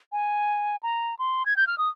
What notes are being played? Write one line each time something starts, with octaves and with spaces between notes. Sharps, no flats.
G#5
A#5
C6
G#6
G6
F6
D#6